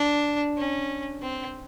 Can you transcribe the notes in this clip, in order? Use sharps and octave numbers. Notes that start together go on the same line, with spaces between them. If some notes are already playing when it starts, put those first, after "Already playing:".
Already playing: D4
C#4
C4